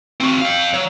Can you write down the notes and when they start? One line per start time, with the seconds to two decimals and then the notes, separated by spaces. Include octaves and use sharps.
0.20 C4 F#4
0.41 F5 G5
0.74 F#3